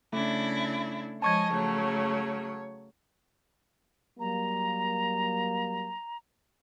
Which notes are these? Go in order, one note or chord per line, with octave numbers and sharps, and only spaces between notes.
C#3 A3 D4 E4
F3 G#3 C#5 D#5 G#5 A5 C#6 G#6
C#3 F#3 A3 C#5
F#3 G3 A#3 A#5